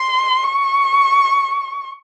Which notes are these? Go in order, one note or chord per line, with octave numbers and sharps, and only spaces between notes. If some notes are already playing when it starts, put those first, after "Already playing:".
Already playing: C6
C#6